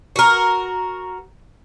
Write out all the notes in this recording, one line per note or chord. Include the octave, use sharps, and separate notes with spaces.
F#4 A#4